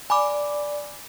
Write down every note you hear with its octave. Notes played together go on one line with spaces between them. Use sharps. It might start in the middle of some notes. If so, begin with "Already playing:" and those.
D5 G#5 B5 D6